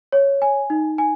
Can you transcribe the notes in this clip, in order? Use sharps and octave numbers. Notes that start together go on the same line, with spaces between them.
C#5
G#5
D#4
G#5